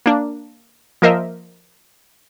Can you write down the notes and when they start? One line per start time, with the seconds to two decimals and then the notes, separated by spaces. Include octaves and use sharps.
0.06 A#3 D4
1.02 F3 A#3 A#4 C5 D#5 E5